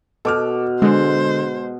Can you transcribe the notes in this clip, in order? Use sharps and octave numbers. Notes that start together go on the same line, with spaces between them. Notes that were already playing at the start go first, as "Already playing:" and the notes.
B2 A4 D6 F6
D3 G#3 C5